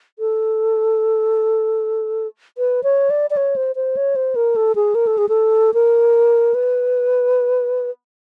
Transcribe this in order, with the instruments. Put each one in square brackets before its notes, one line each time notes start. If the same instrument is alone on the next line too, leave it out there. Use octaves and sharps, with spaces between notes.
[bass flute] A4
B4
C#5
D5
D5
C#5
C5
C5
C#5
C5
A#4
A4
G#4
A#4
A4
G#4
A4
A#4
B4